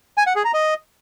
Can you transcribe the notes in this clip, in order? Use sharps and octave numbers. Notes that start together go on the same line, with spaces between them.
G#5
F#5
G#4
A#5
D#5